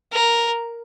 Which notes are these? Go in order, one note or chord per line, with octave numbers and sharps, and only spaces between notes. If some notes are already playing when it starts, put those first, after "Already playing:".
A#4